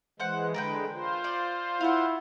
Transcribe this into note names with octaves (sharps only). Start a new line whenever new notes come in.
E3 G#3 C5 F#5
D3 G#3 A#4 B4 G5
F4 C5
D5
E4 F5 F#5